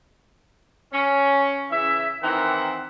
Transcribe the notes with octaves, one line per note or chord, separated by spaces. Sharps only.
C#4
C#3 E3 E4 E5
D#3 E3 C4 E4 A#4 F#5